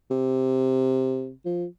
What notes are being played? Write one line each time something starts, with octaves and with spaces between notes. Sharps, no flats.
C3
F3